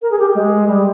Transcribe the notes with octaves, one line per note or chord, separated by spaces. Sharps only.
A#4
G#4
G4
G#3
G3